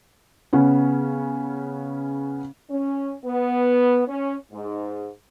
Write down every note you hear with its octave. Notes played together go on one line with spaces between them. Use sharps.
C#3 B3 C#4
C#4
B3
C#4
G#2